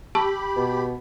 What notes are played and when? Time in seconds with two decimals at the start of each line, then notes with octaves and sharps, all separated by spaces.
0.15 G4 A5 B5 C#6 E6
0.56 B2